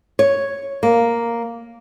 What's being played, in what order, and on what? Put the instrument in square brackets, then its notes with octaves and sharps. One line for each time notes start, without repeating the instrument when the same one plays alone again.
[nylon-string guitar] C#5
A#3